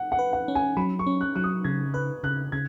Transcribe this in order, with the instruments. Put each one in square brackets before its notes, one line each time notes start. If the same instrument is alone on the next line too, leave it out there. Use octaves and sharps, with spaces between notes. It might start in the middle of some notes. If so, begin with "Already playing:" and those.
Already playing: [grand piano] F#5
F#5
[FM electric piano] B4
[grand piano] F#5
[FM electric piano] C#4
[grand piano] G#5
[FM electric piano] F#3 [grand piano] B5
[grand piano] C#6
[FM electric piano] C#4
[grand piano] F#6
[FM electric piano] F#3 [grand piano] F#6
[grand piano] D#6
[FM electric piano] C#3 [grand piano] G#6
[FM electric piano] B4 [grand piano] F#6
[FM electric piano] C#3 [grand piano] F#6
[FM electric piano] C#3 [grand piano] G#6